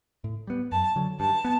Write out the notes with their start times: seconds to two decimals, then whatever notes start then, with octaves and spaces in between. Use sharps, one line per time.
0.24 A2
0.47 G3 B3
0.72 F#2 A5
0.96 D3 F#3
1.20 G2 A5
1.45 B3